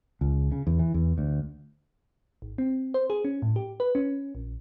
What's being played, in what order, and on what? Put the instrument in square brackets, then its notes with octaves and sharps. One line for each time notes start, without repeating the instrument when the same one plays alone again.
[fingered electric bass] C#2
C#3
E2
E3
E2
D2
[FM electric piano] G#1
C4
C5
G#4
C#4
A2
G4
B4
C#4
A#1